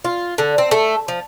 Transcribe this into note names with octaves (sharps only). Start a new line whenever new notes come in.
F4
D3
C4
A3
F3